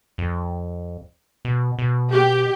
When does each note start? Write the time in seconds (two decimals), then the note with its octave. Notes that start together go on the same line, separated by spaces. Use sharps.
0.18 F2
1.45 B2
1.79 B2
2.12 G4